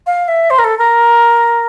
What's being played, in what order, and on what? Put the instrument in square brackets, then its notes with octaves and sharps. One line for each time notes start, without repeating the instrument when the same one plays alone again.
[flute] F5
E5
C5
A#4
A4
A#4